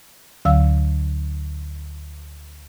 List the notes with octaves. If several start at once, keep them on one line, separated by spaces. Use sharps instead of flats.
D2 D3 F#3 F5 E6